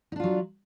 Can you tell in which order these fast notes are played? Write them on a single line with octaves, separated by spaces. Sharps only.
D#4 D4 F4 F#3